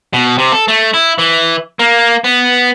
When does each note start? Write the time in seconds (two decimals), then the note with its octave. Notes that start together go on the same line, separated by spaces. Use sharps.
0.13 B2
0.38 C3
0.52 A4
0.68 A3
0.94 E4
1.18 E3
1.79 A#3
2.24 B3